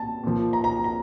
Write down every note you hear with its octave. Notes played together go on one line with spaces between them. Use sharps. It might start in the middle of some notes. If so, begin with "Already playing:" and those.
Already playing: A#2 A5
A#2 F3
A#5
A#5
A#5